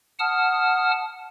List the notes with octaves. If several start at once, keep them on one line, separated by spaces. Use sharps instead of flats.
F#5 A5 D#6 F6